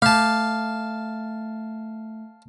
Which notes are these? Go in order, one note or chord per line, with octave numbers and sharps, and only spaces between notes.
A3 F5 A5